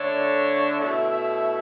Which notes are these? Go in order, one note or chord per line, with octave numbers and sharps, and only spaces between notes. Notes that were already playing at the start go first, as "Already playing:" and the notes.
Already playing: D3 A3 D4 C#5
B2 A3 E4 E5
E5